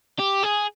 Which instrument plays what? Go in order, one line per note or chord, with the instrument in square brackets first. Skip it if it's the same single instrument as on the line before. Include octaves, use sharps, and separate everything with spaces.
[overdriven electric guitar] G4
G#4